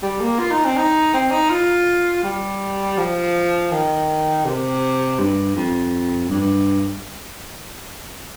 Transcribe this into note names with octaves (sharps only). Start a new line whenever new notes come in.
G3
A#3
F4
D#4
C4
D#4
C4
D#4
F4
G3
F3
D#3
C3
G2
F2
G2